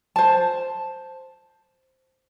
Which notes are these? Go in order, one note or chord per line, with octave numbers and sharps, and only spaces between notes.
C5 A5